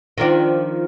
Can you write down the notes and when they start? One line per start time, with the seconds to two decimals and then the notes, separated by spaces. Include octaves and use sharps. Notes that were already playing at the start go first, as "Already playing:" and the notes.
0.18 D#3 F3 D4